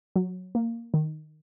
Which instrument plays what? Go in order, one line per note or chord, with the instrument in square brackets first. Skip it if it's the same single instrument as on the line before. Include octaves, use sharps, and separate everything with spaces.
[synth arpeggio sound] F#3
A#3
D#3